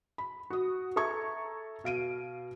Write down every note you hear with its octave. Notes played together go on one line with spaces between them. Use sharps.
B5
F#4 D#6
A4 E5 A#5 C#6 G#6
B2 F5 D7 D#7